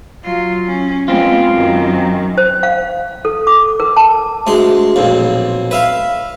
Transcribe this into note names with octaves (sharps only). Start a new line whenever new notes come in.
F#3 F4
C#4
G#3 B3 C4 F4
F#2 D#3
C5
F5
A4
D6
A#4
A5
D2 G#3 C6
B1 F2 A#2
B4 E5 F5